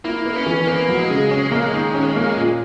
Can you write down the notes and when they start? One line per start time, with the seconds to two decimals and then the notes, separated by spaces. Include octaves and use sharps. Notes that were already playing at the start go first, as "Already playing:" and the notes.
0.05 A#3 E4
0.26 B3
0.36 C#4
0.46 E3
0.67 A#3 B3
0.89 F#3
0.99 G#3
1.10 C#3
1.31 C#4
1.52 A#3
1.73 D#3
1.94 C#4
2.16 A#3
2.37 A#2